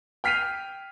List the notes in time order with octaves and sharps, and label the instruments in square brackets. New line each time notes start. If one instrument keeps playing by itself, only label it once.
[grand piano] G5 F6 B6 C7 D#7 F7